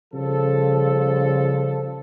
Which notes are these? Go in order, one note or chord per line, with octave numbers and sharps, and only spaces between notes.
C#3 F3 G3 A4